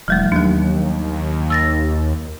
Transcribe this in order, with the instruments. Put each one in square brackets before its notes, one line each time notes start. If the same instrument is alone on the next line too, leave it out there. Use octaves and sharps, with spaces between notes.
[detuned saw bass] E1 [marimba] F3 G3 A3
[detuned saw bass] D#2 [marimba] F#3 D4
[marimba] E6 A6 A#6